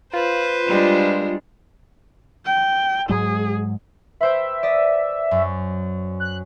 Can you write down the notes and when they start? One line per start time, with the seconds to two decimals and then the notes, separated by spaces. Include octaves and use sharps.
0.13 F4 B4 C5
0.67 G3 G#3 D4
2.45 G5
3.09 G#2 F#3 G#3 G#4
4.21 B4 C5 E5 G5
4.63 D5 D#5 B6
5.31 F#2
6.20 F#6